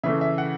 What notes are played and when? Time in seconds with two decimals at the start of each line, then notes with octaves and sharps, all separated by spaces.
0.04 C#3 E3 A3 E5
0.21 E5
0.38 F#5